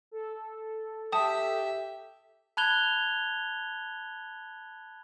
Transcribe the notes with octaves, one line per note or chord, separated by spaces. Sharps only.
A4
G4 E5 G5 A5 D#6
A5 B5 F#6 G#6 F7 G7